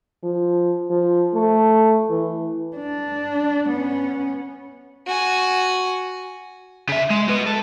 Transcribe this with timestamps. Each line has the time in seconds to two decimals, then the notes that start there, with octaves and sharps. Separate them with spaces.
0.23 F3
0.90 F3
1.35 A3
2.10 E3
2.77 D4
3.69 B3 C#4
5.07 F#4 G#5
6.89 C#3 E5
7.10 G#3
7.28 F#4 B4
7.47 A4